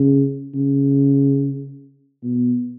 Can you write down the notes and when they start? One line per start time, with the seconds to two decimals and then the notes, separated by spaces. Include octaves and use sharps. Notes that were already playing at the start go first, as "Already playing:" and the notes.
Already playing: C#3
0.55 C#3
2.24 B2